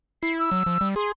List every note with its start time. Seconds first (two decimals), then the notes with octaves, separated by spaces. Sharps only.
0.23 E4 C7
0.39 E6
0.51 F#3
0.66 F3
0.81 G3
0.96 G#4 C6